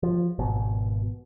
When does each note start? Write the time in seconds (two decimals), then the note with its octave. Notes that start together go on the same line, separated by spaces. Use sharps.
0.03 F3
0.39 G#1 B2